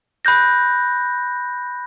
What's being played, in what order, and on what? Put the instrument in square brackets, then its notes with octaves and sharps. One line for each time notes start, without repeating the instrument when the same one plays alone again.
[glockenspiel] B5 F#6 G6 A#6